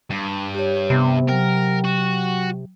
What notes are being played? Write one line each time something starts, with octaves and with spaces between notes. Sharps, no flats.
G2
G4 C#5
C3 B3
F#3 A#4 G5
F#4